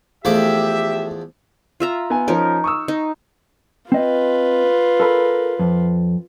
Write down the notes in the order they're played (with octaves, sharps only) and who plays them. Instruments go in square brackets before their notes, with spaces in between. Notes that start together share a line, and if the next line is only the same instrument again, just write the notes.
[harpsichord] E2 F3 D6 [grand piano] A3 [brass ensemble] G4 E5
[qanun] F4 E5 A#5
[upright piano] B3 G#5
[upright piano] F3 C#4 [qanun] D#4 A#4
[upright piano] C#6 D#6 E6
[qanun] D#4
[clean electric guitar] C4 D#5 [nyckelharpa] F4 B4
[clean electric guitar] A4 A#4 B5
F2